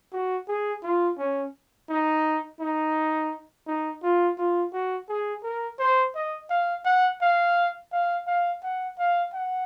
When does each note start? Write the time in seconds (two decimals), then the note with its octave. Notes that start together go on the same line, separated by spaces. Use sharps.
0.13 F#4
0.48 G#4
0.83 F4
1.18 C#4
1.89 D#4
2.60 D#4
3.67 D#4
4.03 F4
4.38 F4
4.72 F#4
5.09 G#4
5.43 A#4
5.79 C5
6.15 D#5
6.50 F5
6.85 F#5
7.21 F5
7.92 F5
8.27 F5
8.63 F#5
8.98 F5
9.34 F#5